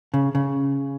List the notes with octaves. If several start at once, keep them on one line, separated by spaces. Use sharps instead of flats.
C#3
C#3